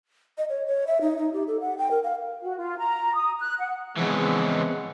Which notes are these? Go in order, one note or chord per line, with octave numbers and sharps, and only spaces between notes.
D#5
C#5
C#5
E5
D#4
D#4
G4
A4
F#5
G5
A#4
F5
F#4
F4
A#5
D#6
F#6
F#5
C#3 E3 F3 G#3 B3 C4 F#5